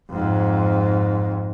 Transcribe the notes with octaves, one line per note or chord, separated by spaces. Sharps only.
F2 G#2